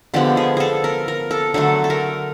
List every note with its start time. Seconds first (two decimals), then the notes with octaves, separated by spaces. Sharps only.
0.14 D3 F3 G#3 B3 G4
0.37 G#4
0.57 G#4 A4
0.84 A#4
1.08 A#4
1.31 A4
1.54 D3 F#3 A3 A4
1.84 A4
1.90 A#4